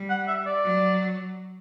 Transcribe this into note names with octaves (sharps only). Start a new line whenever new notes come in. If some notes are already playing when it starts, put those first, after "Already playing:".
Already playing: G3
F#5
E5
D5
F#3